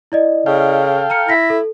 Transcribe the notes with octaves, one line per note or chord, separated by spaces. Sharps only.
E4 D5 D#5
C#3 A4 F5 G5
A#5 F6 C#7
E4 A#6 B6
A4